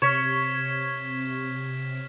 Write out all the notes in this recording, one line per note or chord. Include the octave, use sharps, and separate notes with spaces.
C3 C#5 F6 B6 E7